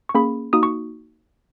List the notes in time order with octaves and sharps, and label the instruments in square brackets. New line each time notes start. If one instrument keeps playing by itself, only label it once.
[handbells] C#6
A#3 C#4 G#4 B5
A#3 D#4 F#4 D#6
C#6